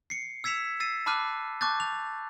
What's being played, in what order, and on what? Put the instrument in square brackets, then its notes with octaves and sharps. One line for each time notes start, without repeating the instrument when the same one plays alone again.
[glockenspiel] C7 C#7
E6 G#6 B6 C#7 E7 F7
E6 A6 C7 D#7
A5 B5 D6 F6 F#6 D#7
A5 C#6 D6 F#6 G6 A6
F7